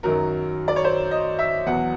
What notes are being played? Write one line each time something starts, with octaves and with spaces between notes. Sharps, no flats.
F#2 D#3 F#3 A#4
D5
C#5
C5
D#5
E5
E2 B2 F#3 F#5